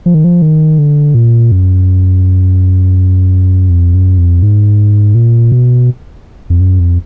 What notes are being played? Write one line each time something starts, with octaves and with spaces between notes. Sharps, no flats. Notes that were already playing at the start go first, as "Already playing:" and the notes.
F3
D#3
F3
D#3
D3
A#2
F#2
F2
F#2
F2
G#2
A#2
B2
F2
F#2
F2